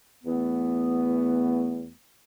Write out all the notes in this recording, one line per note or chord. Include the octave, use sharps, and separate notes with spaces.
E2 E3 A3 B3